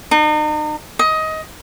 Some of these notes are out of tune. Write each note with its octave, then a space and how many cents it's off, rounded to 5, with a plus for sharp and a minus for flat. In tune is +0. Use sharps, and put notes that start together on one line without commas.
D#4 -40
D#5 +20